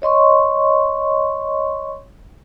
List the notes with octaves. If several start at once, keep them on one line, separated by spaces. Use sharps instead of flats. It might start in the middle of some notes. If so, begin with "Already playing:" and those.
C#5 D#5 C6 C#6